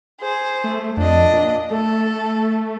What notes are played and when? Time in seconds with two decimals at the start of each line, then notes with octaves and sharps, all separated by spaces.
0.20 G#4 C5
0.64 A3
0.97 F2 D4 D#5
1.33 A#2
1.71 A3 A4